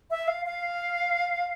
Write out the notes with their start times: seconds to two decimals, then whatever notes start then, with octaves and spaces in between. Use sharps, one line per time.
0.11 E5
0.28 F5
0.46 F5